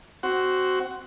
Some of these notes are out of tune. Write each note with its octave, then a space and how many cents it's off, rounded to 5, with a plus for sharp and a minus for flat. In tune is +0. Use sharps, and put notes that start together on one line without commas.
C4 +0 F#4 +10